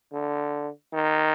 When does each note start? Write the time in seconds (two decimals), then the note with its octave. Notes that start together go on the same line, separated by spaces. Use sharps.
0.13 D3
0.93 D#3